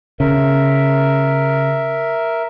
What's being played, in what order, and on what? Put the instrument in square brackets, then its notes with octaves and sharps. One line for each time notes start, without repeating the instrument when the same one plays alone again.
[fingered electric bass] C#3 [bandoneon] A#4 E5